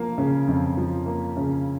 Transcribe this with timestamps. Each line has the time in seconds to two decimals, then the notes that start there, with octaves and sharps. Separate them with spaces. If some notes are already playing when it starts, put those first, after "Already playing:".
Already playing: F3 A#3
0.18 C#3
0.48 F2
0.77 F3
1.06 A#3
1.37 C#3